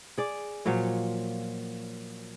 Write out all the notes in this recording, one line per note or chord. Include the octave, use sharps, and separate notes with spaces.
G#4 D5
A#2 F3 F#3 C#5